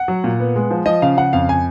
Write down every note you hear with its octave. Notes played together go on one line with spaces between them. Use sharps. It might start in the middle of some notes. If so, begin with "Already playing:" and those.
Already playing: F#5
F#3
A#2
B3
G#3
F3
F3 D#5
C#3 F5
C#3 F#5
F2 F5
G#5